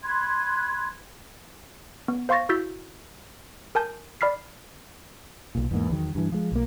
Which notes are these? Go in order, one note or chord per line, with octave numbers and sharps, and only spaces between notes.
B5 C6 F#6 G#6
B3
C5 F5 C6 C#6 A6 A#6
E4 F#4 E6 G6 A6 B6
A#4 G#5 A5 G6
D5 B5 F6 B6 C7
B1 A#2
E2 G#2 A#3
E2 D#3 F#3
G2 E3
F3 G#3
B1 A#3